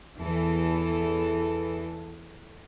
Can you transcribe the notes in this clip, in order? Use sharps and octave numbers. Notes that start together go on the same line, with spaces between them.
E2 E3 A4